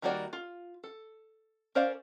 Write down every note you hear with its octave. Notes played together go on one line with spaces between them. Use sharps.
D#3 G3 A#3 F#4 D5
F4
A4
C#4 A#4 C5 D5 F5